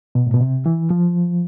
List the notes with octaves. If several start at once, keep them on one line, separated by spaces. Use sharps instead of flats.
B2
A2
B2
C3
E3
F3